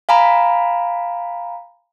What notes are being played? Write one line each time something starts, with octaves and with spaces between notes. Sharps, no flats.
F5 G#5 A#5 B5